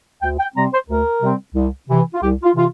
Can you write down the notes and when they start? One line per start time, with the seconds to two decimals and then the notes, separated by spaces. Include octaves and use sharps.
0.21 D2 G5
0.38 G5
0.55 C3 G3 C4 A#5
0.72 C5
0.88 D2 A#4
1.21 C3 G3 C4
1.54 C2
1.88 C3 E3
2.14 F4
2.20 C2 G4
2.43 F4
2.53 C3 E3 F4